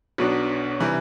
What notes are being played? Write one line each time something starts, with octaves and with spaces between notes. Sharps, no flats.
B1 B2 F#3 B3 D4
C3 E3 G3